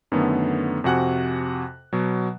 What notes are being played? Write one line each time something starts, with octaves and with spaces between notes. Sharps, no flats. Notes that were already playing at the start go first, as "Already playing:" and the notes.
F#2 D3 D#3 A3 B3
F2 C3 F#4 F#5 G#5 F#6
B2 F#3